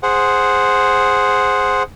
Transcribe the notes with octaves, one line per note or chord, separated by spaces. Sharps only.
G#4 C5 F#5